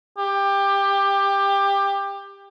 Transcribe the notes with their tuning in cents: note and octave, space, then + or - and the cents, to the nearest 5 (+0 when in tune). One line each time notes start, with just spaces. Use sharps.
G4 +20